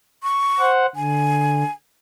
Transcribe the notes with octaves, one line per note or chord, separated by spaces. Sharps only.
C#6
C5 F#5
D3 G#5